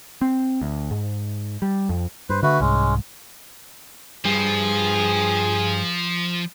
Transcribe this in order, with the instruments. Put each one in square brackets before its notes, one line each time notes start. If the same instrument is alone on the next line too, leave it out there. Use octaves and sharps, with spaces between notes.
[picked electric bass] C4
D2
G#2
G3
F2
[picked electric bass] G2 [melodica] B4 C5
[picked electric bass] D3 [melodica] A3 F#4 B4
[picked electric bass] C2 G#2 [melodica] G#3 C#4
[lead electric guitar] G2 [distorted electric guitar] F3 [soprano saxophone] G#4